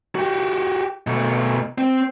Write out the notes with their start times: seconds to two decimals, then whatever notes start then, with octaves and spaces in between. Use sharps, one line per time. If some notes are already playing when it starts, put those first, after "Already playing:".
0.15 F#4 G4
1.07 B2 A3
1.78 C4